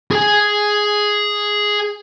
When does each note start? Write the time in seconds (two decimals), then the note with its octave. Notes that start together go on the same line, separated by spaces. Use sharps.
0.11 G#4 G#5